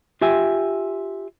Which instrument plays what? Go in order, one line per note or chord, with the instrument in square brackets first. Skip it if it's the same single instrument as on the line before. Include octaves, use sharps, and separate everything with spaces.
[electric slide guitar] F4 G4 E5 G#5